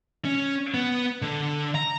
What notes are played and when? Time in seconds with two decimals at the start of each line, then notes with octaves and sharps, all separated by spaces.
0.25 C#4
0.74 B3
1.22 D3
1.75 A#5